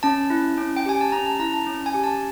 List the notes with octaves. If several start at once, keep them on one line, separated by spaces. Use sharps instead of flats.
C#4 A5
E4
C#4
G5
G4 G#5
A5
C#4 A#5
A5
E4 A#5
A5
C#4
G#5
G4
A5